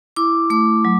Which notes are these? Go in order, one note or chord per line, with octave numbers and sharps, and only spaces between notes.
E4 D6
A3 D6
F#3